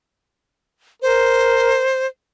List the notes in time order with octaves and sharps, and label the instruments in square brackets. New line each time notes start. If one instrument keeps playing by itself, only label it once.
[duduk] A#4 [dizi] C5